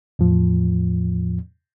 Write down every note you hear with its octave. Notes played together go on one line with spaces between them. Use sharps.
E2 A2 F3